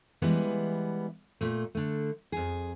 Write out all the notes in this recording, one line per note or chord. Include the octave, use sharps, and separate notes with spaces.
E3 G3 G#3 B3 B4
A#2 A3
D3 A3
F2 G#4